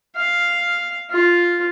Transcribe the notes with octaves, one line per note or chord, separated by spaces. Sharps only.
F5
F4